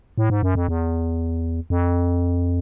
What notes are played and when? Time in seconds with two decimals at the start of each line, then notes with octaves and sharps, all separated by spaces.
0.18 A2
0.30 G#2
0.43 F#2
0.55 F2
0.68 E2
1.70 F2